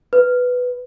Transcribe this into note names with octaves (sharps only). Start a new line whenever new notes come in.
B4